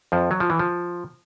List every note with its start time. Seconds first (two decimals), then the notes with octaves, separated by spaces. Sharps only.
0.12 F2 F3
0.31 F#3
0.40 F3
0.50 E3
0.59 F3